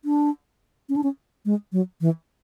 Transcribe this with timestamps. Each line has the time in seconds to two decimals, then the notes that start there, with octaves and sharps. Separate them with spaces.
0.05 D4
0.89 C#4
0.96 D4
1.03 C#4
1.45 G#3
1.72 F#3
2.01 E3